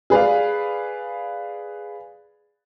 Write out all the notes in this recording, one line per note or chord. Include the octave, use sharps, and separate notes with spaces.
G#4 B4 D5 F5